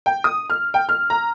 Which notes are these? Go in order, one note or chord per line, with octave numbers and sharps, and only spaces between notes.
G5
D#6
F6
G5
F6
A#5